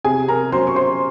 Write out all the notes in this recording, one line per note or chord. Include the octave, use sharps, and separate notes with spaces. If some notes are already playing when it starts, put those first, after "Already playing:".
C3 G#4 G#5
A#4 A#5
F#3 C#4 C5 C6
C#6
C5 C6